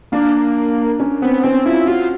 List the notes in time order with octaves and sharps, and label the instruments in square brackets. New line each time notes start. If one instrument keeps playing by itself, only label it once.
[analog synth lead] A#3 [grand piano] D4
[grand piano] C#4
[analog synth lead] B3 [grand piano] C4
[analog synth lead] C4 [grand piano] C#4
[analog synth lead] E4 [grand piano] F4
[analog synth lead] F4 [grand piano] F#4